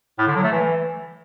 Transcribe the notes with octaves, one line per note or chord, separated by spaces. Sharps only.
A2
D3
F#3
A3
E3